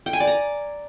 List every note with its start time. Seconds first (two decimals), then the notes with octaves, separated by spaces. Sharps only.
0.06 G5
0.13 G#5
0.20 D5
0.27 A#5